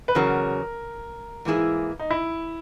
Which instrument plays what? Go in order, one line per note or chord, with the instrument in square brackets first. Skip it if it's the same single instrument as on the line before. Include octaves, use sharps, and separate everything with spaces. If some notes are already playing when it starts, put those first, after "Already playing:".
[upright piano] B4
[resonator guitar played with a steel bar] E2 C#3 F#3 [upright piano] A#4
[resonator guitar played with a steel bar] G#2 E3 A#3 E4 G#4
[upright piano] D#4
E4